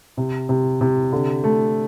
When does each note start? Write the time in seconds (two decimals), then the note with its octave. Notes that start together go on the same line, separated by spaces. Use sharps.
0.17 C3
0.49 C3
0.81 C3
1.13 D3
1.44 A3